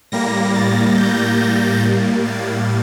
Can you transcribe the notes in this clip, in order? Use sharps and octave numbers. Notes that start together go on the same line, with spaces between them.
A2 G3 A#3 A#6
A6
G6
A2 G3 A#3
A6